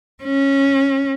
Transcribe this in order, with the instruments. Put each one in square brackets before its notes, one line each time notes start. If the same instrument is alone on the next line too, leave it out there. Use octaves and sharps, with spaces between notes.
[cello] C#4